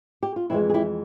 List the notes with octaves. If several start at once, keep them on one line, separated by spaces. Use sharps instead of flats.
G4
F4
F2 E3 G#3 C4 E4
G#4
E4 G4